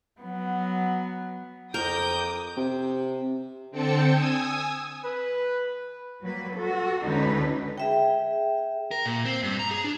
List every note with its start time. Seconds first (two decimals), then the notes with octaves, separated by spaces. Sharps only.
0.21 F#3 B3
1.74 F2 A#4 G5 D6 D#6 G6
2.57 C3
3.71 D3 C4 G5 A5 C#7
4.11 G#5 D#6 E6 G#6
5.04 B4
6.22 F#3 G3 A#3 B4
6.55 F#4 A4
7.04 D2 D3 G#3 C#4 D#4 B4
7.78 G#4 E5 G5
8.91 A#4
9.06 A#2
9.25 C4
9.43 G2
9.59 A#5
9.71 G#4
9.84 D4